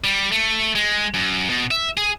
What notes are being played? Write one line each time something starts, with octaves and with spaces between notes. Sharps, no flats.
G3
A3
G#3
F#2
B2
E5
G#4